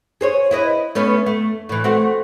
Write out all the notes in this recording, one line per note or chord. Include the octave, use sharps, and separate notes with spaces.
G#4 C5 C#5
E4 B4 D#5
A3 B3 C#4
A3
A2 E3
A3 C4 F#4